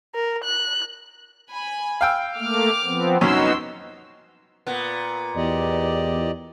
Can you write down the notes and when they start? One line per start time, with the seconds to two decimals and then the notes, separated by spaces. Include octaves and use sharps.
0.15 A#4
0.44 F#6
1.51 G#5 B5
2.01 F5 G5 E6
2.38 A3 A#3 D6 F6
2.84 F3 B3 C4
3.21 C2 F#2 B3 C#4 D#4 F#4 C6 E6
4.67 A#2 B3
5.37 E2 G4 D5 D#5